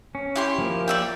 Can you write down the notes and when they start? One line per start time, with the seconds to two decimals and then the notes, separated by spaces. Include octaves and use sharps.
0.15 C#4
0.36 E4 G4 C6
0.58 F3 A#3
0.88 D5 E5 G5